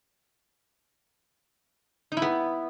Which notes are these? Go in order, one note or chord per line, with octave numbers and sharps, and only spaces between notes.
D#4
E4
B3